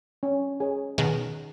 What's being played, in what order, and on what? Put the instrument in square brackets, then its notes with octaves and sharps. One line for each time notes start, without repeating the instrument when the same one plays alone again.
[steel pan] C#4
G#4 C#5
[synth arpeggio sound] B2 D#3 [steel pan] G#4